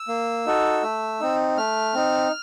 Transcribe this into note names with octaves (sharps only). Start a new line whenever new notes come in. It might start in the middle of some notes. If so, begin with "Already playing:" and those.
Already playing: E6
A#3
D#4 F#4 A4
A3
C4 D#4
A3 F6
C4 D#4